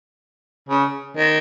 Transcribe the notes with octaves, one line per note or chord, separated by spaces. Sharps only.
C#3
D#3